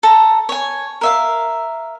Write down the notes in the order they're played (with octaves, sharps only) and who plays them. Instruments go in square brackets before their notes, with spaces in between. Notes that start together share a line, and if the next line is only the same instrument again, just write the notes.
[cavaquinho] A4 A#5
C#5 G#5
A#4 E5 F5